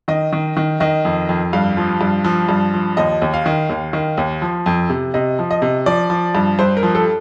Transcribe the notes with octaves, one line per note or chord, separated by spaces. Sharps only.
D#3 D#5
D#3
D#3
D#3 D#5
F2
F2
G2 F5
F3
G2
F3
G2
F3
D#2 D#5
D#2
F5
D#3
D#2
D#3
D#2
F3
F2
C3
C3 D#5
F3
D#5
C3
F3 D5
F3
G2
G2 C5
A#4
F3
A4